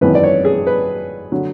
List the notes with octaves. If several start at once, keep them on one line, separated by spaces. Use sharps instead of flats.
G#1 F#2 E3 B4
D5
C#5
G#4
B4
D3 F#3